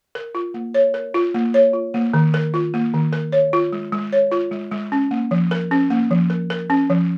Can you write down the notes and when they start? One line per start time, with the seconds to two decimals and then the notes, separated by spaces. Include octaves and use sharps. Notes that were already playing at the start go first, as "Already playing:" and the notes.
0.15 A#4
0.35 F4
0.54 A#3
0.74 C#5
0.94 A#4
1.14 F4
1.34 A#3
1.54 C#5
1.73 F4
1.94 A#3
2.14 D#3
2.34 A#4
2.54 F4
2.74 A#3
2.94 D#3
3.13 A#4
3.32 C#5
3.53 F4
3.72 G#3
3.92 G#3
4.12 C#5
4.32 F4
4.51 G#3
4.71 G#3
4.92 C#4
5.11 A#3
5.31 F3
5.51 A#4
5.71 C#4
5.90 A#3
6.11 F3
6.30 A#4
6.50 A#4
6.70 C#4
6.90 F3